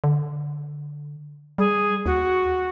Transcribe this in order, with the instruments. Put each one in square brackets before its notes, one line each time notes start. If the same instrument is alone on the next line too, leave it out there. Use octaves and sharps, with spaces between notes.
[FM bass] D3
[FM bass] G3 [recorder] G#4
[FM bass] D#2 [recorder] F#4